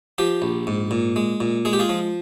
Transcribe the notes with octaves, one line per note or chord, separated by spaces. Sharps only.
F3 G4
A#1
G#2
A#2
G#3
A#2
G#3 G#4
G4
F4 G#4
F3